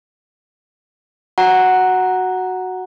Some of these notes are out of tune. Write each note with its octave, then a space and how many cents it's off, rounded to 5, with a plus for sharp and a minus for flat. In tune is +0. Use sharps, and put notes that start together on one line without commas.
F#4 +0 F#5 +0 A#5 +0